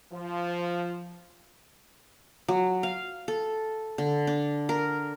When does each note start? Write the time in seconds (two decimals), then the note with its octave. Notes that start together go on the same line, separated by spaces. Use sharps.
0.13 F3
2.48 F#3
2.83 F5
3.28 A4
3.98 D3
4.27 D4
4.69 A#4